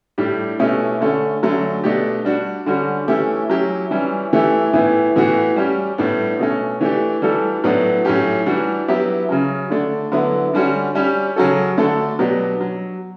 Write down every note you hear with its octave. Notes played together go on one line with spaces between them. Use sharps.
A2 G3 D4 G4
B2 A3 C#4 E4 G4
D3 A3 C#4
D3 F#3 A3 C#4
B2 A3 D4 G4
G3 D4 F#4
D3 G3 C#4 F#4
E3 A3 C#4 E4 G4
F#3 C#4 E4 G4
E3 G3 C#4 E4
E3 A3 E4 G4
A2 E3 B3 E4
A2 E3 B3 F#4
G3 C#4 G4
A2 G3 B3 D4
B2 A3 C#4
E3 A3 D4 G4
E3 G3 D4 F#4 A4
A2 F#3 B3 D4 F#4
A2 F#3 C#4 G4
E3 G3 D4 F#4
F#3 B3 E4 G4
C#3 F#3 C#4
D3 A3 D4
D3 F#3 B3 E4
D3 G3 C#4 F#4
G3 C#4 G4
C#3 F#3 C#4 F#4 A4
D3 A3 D4 A4
B2 F#3 B3 D4 G4
F#3